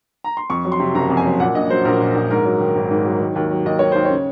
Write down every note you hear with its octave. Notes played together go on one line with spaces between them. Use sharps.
A#5
C6
F2 C#6
F#3
C6
C3
F#1 A#5
F2
G#5
F#3
A#2 F#5
A#1 D#5
F#3 C5
A#1 A#4
A#2
A#1
G#2 A#4
F#3
D#3
G#1
G#2
F#3
D#3
D#2
F#3
D#2 D#5
D#3 C#5
D#2 C5
C#5
C#3